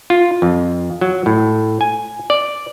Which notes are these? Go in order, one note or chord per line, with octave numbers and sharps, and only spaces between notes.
F4
F2
F#3
A2
G#5
D5